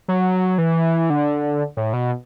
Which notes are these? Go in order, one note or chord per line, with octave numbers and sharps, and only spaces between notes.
F#3
E3
D3
A2
B2